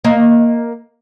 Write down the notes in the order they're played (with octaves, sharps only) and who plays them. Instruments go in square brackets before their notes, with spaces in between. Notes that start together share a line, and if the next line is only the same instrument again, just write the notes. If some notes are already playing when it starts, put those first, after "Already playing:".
[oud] A#3 D#5